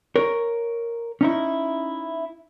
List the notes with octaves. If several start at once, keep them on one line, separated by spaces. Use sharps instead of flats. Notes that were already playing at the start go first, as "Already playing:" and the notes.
A#4 C#5
C#4 D#4 E4